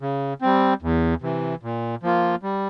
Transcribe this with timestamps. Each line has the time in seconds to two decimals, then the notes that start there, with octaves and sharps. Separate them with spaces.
0.01 C#3
0.41 G3 C4
0.82 E2
1.22 C3 E3
1.63 A#2
2.03 F3 A#3 F4
2.43 G3